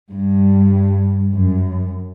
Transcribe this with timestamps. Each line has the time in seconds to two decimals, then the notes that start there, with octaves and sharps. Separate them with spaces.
0.10 G2
1.32 F#2